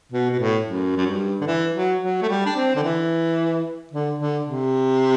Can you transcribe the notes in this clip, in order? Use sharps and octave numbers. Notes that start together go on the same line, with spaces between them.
B2
B2
A2
F#2
F#2
G2
D3
E3
F#3
F#3
A3
G3
D4
C4
D3
E3
D3
D3
C3